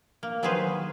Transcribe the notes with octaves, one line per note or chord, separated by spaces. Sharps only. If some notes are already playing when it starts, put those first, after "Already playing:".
A#3
D#3 F#3 B3 G#4 B4 C5